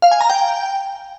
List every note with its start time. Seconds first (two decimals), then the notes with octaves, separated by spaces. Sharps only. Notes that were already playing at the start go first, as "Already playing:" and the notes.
0.02 F5
0.11 G#5
0.21 A#5
0.30 G5